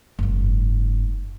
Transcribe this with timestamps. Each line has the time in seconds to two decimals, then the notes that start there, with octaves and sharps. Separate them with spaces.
0.19 F#1 G#2